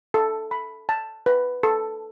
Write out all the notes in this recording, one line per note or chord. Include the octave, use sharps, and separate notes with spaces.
A4
B5
A5
B4
A4